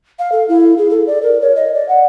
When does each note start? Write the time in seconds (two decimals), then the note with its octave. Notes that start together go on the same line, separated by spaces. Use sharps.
0.19 F5
0.32 A4
0.49 E4
0.78 G#4
0.90 A4
1.07 D5
1.23 A#4
1.41 C#5
1.56 D#5
1.74 D5
1.89 F#5